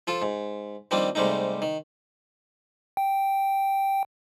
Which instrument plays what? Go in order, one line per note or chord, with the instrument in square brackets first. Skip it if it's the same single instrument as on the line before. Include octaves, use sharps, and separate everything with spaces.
[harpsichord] F3 F4 A4
G#2
D#3 F3 G3 A#3 C4 D4
G#2 C3 G3 A3 D#4
D#3
[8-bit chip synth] G5